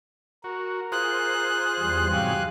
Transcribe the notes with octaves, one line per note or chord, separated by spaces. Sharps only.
F#4 A#4
F4 G#4 C5 F#6
E2 G3
G#2 C3 F#3 G4 F5 G#5